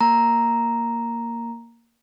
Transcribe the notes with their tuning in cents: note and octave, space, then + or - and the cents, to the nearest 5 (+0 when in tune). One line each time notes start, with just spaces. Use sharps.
A#3 -5 A#5 +0